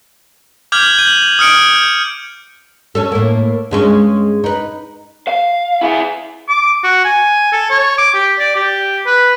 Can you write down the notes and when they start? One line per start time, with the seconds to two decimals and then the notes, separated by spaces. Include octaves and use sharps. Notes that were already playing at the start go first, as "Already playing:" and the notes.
0.72 D6 F6 G6 G#6 F#7
0.98 G6 D#7 F#7
1.39 D#6 F6 C#7 D7
1.75 G6
2.95 C#4 D4 A4
3.12 A2 A#3
3.71 G2 G#3 C#4
4.44 D#4 B4
5.27 F5
5.81 E4 G#4
6.48 D6
6.84 F#4
7.05 G#5
7.52 A4
7.70 C#5
7.98 D6
8.14 G4
8.39 D5
8.56 G4
9.06 B4